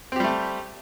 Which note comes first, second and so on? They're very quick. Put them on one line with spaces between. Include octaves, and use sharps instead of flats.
C4 G4 G3 A3